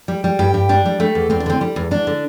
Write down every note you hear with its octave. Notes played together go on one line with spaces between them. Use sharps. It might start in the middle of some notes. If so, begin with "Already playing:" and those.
G3
G3
G2 G4
G2
G3 D4
G3
G3 A3
E2
E2 C4
D4
D3 C4
G3
E2
E2 D4
D3